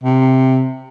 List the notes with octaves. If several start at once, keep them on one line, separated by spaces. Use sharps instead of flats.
C3